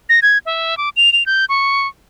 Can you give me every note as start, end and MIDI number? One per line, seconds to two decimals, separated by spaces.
0.09 0.20 94
0.22 0.38 92
0.46 0.77 76
0.78 0.89 86
0.96 1.12 101
1.13 1.26 101
1.26 1.45 91
1.49 1.87 85